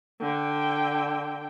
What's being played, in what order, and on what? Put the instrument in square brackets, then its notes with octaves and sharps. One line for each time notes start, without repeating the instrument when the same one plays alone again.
[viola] D3 G5